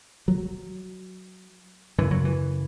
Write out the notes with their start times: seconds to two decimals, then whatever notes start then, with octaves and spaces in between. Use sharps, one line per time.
0.28 F#3
1.98 F#2 C#3 E3
2.11 F#3
2.25 E3